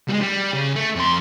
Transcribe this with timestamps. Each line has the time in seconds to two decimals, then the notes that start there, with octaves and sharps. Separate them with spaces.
0.09 G3 G#3
0.22 G3
0.54 C#3
0.76 A3
0.96 F2 C6